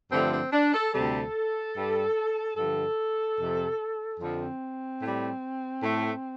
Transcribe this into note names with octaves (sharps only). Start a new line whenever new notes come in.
G2 D3 F3 A3 C4
C4
D4
A4
D2 C3 G3 A4
G2 G3
G2 D3 F3 A4
F2 C3 F3
F2 D3 F3 C4
A2 G3
A2 A3